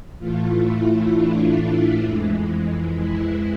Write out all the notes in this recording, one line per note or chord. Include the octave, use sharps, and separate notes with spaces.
A2 E3 A3 F4
E4
D4
F2 E3 G#3
E4